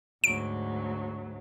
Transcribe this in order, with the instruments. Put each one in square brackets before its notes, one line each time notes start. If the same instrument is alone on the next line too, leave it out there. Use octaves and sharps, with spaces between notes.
[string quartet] D2 G#2 F#3 [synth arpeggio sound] D7